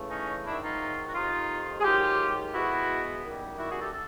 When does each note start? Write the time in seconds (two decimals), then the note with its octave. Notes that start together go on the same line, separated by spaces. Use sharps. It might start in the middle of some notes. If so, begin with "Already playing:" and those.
Already playing: C#3 E3 A3
0.11 C#4 D#4
0.45 G#2 D#3 F#3 D4 E4
0.63 D#4 F4
1.08 F#4
1.15 F2 C3 D#3 D#4 F4
1.80 G#4
1.84 G#2 D#3 F#3 F4 G4
2.54 B2 G#3 B3 E4 F#4
3.24 F#2 D#3 G3
3.58 E4 F#4
3.70 F#4 G#4
3.81 G4 A4
3.92 A4